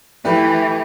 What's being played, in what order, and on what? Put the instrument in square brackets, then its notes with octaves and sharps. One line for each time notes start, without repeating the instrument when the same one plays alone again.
[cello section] E3 [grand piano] A3 G4 B4